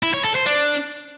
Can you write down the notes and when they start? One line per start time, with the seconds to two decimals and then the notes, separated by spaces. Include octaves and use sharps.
0.03 E4
0.14 C#5
0.24 A4
0.35 C5
0.46 D4